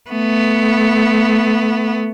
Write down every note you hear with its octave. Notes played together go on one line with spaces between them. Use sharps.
A3 B3